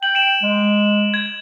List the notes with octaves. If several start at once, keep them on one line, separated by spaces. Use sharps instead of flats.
G5 F#7
D7 E7 F#7
G#3
G#6